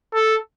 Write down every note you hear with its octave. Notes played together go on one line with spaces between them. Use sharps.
A4